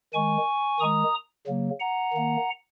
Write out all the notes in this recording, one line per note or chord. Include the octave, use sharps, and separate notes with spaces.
D#3 G#3 G#5 C#6
D#3 G#3 A#5 D#6
C#3 F#3 A#3
F#5 A#5
D#3 A#3